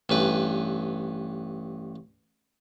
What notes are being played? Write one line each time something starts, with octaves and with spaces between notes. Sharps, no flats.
A1 G2 B4